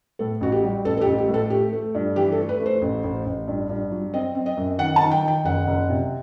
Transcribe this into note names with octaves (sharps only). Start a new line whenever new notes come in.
A2 A4
A1 F#4
G4
G3
A1 A4
A4
G4
A1
G4
A2
A4
A3 G4
A3
G2
E3 G4
A4
A3
B4
A3
C5
A1
A1
A1
G2
G2
F#3
C4 D#5
C4
D#5
F#2
D#3 F#5
A5
D#3
G5
D#3
G5
F#1 F#5
F#1
C3